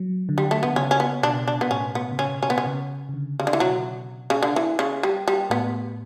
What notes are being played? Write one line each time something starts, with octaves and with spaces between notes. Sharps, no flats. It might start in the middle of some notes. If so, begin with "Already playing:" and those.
Already playing: F#3
D3
G3
A3
D3 B3
C#3 C#4
C#4
B3
B2 D4
D4
B2 B3
A2 C#4
B3
C#3
B2 C#4
C#4
B3
C#4
C#3
C#3
D3
C#3
D3
E3
B2 F#3
C#3
D3
E3
C#3
G3
G3
A2 B3